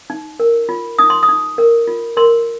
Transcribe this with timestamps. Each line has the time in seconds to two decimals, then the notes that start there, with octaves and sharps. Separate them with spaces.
0.10 D#4
0.40 A#4
0.69 F4
0.99 D#4 D#6
1.10 C6
1.23 D#6
1.29 D#4
1.58 A#4
1.87 F4
2.17 A#4 C6